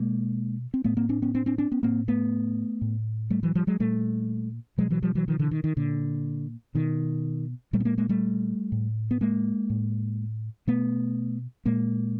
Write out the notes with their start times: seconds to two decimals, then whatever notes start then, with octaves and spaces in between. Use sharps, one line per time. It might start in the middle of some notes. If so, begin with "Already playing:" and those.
Already playing: B2 G#3 A#3
0.74 C4
0.84 A2 A3 B3
0.97 A#3 C4
1.09 C4 D4
1.22 B3 C#4
1.34 C4 D4
1.46 C4 D4
1.58 C4 D4
1.72 B3 C#4
1.83 A2 A#3 C4
2.08 A3 B3
2.81 A2
3.30 G3 A3
3.43 E3 F#3
3.55 F3 G3
3.67 F#3 G#3
3.80 A#2 G3 A3
4.78 B2 F#3 G#3
4.90 E3 F#3
5.02 F3 G3
5.15 E3 F#3
5.28 D#3 F3
5.39 D3 E3
5.51 D#3
5.64 D#3
5.76 A#2 D3
6.75 B2 D#3
7.73 A#2 G3 A3
7.80 B3
7.85 G#3 A#3
7.98 G#3 A#3
8.09 G3 A3
8.72 A2
9.11 B3
9.21 G#3 A#3
9.70 A2
10.67 B2 A3 B3
11.65 A#2 G#3 A#3